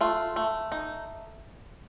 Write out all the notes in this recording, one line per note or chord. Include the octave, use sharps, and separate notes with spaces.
A3 F4
A3
D#4